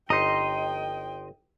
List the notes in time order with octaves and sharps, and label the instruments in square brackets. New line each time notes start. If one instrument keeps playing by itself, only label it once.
[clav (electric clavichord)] G1 D#4 [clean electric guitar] D#5 [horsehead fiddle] G5 [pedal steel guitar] A#5 C6